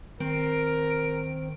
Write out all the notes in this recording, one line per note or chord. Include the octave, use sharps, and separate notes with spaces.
D#3 C4 A#4 D7